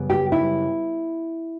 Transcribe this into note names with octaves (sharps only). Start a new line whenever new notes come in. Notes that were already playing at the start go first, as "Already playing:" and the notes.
Already playing: F#2 C#3 G3 B3
G4
E4